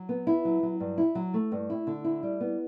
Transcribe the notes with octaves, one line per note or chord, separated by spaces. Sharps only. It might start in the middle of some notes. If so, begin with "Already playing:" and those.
Already playing: F#3
B3
E4
F#3
F#3
G2
E4
F#3
A3
G2
E4
D3
E4
G3
B3